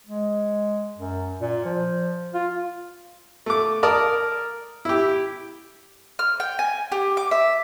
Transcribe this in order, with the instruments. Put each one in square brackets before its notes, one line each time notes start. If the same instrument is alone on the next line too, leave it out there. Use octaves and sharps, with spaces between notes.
[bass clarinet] G#3
F#2
A#2
F3
F4
[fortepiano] A3 D6
A#4 D5 A5 D#6
E4 G4
[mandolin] F6
G5
G#5
G4
D6
E5